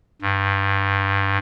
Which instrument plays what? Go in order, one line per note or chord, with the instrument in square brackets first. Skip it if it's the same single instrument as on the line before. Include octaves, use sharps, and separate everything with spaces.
[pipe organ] G2